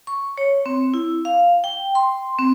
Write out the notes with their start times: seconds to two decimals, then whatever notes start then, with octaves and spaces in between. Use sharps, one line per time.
0.07 C#6
0.38 C#5
0.66 C4
0.94 E4
1.25 F5
1.64 G5
1.95 C6
2.39 C4